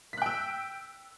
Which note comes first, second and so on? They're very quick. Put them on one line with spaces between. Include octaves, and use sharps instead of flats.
B6 F#6 G5 E6